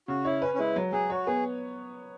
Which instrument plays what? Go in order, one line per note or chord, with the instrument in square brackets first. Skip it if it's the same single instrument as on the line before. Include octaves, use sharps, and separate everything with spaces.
[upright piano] C#3 [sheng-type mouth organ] F#4
[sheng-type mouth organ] E4 [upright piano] C#5
[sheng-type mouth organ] C#4 [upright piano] B4
[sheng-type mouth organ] C#4
[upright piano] G#3 [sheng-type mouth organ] E4
[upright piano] F#3
[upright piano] F#3 [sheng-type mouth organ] G#4
[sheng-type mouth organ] F#4 [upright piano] C#5
[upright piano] B3 [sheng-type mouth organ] G#4